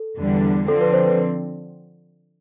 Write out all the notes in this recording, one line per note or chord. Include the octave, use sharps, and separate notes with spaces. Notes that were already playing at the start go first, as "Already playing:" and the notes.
Already playing: A4
E2 D3 G3
D3 F3 C4 A4
B4
C5
B4